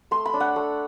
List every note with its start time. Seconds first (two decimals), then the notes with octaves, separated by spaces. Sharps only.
0.11 A3 C6
0.26 B5
0.33 D4
0.40 F#5
0.56 A3